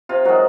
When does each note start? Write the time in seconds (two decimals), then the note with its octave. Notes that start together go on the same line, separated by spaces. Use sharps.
0.09 C3 F4
0.25 D#3 F#3 G#3 F#4